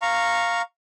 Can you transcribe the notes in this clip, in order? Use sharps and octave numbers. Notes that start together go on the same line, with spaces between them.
F5 A#5 C#6